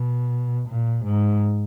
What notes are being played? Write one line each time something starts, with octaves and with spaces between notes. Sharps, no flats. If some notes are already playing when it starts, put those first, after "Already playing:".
Already playing: B2
A#2
G#2